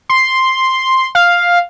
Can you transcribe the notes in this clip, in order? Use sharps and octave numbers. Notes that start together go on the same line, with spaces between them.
C6
F5